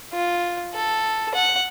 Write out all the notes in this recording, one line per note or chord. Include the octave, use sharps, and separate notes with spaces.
F4
A4
F#5